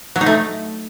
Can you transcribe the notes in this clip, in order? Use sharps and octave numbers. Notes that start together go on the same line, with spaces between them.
F#3
D#4
A3